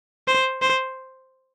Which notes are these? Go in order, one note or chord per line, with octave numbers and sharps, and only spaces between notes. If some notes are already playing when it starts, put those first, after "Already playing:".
C5
C5